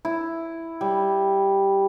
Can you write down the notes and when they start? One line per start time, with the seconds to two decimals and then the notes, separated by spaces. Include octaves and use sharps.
0.05 E4
0.81 G3